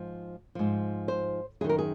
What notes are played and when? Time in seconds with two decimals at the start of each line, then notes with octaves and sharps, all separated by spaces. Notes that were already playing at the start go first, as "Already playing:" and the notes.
Already playing: G#2 F3
0.55 G#2 F3
1.08 C5
1.61 F#2 G#4
1.64 D#3
1.69 A#4
1.78 G#4